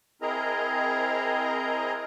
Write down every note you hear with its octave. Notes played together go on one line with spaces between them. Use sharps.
C4 E4 G#4 A#4 D#5 A#5